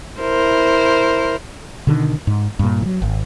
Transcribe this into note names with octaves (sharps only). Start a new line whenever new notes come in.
E4 A#4 C5
B2 D3 D#3
G#2
G2 A#2
E3 F#3
G#1